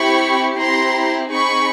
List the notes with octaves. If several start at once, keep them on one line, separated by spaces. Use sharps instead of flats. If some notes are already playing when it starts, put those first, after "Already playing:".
Already playing: C4 E4 G4 B5 C#6
C4 E4 G4 A#5 C6
C4 D#4 G#4 B5 C#6